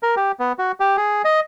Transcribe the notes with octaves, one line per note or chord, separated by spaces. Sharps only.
A#4
G4
B3
F#4
G4
G#4
D#5